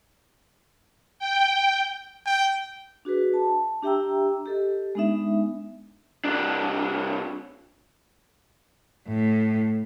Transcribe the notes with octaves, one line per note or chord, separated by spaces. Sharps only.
G5
G5
D4 F#4 G#4 B4
A5
D4 G4 E5 G5 A#5 E6
G4 A4 D#5
G#3 B3 D4 D#4 E5
C2 D4
A2